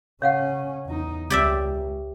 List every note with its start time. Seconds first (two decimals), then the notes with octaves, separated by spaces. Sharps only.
0.22 C#3 C#4 C#5 F5 F#5
0.86 E2 D#4
1.30 C#2 G4 D5 E5